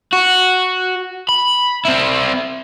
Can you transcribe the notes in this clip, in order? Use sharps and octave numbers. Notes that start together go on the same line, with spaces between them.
F#4
B5
C4 E4